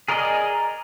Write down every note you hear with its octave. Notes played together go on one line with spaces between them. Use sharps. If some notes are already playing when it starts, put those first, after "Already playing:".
G#4 A#4 D5 D#5